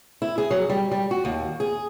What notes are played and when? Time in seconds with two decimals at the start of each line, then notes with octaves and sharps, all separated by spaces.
0.22 E4
0.38 G#4
0.51 F#3
0.70 G3
0.92 G3
1.11 F#4
1.25 D#2
1.60 G#4